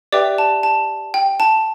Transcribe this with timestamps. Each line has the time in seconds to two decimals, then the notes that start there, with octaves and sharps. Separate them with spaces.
0.12 G4 B4 D5 E5 G5 D6
0.38 A5
0.63 A5
1.14 G5
1.40 A5